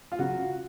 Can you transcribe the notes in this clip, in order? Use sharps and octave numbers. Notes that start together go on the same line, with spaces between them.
F4
C#3 F#3 F#4